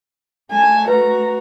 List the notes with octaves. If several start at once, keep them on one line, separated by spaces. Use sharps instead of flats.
A3 G#5 A5
F#4 B4 A#5